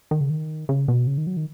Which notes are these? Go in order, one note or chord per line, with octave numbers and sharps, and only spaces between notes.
D#3
C#3
D#3
C#3
B2
C#3
D#3
F#3
D#3